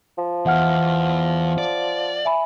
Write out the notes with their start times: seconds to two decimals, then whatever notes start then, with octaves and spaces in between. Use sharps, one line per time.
0.18 F3
0.46 E2 E5 F#5 F6
1.58 D5
2.25 E5 G#5 B5